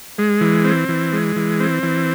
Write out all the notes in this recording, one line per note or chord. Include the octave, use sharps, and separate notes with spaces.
G#3
E3
C4
E3
G#3
E3
C4
E3